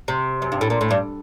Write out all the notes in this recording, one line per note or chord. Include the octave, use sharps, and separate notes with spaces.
C3
F#2
G2
A2
A#2
A2
G2